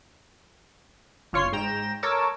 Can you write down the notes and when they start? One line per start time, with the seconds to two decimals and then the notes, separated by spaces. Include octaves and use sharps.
1.33 G1 F4 C#5 C6 C7
1.53 G#2 G5 A#5 E7
2.03 A4 A#4 C#5 D6 E6